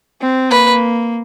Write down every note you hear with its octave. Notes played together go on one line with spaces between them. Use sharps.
C4
A#3 B4